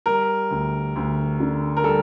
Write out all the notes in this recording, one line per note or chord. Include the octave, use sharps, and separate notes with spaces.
G3 A#4
D2
D2
D3
A#4
G3 A4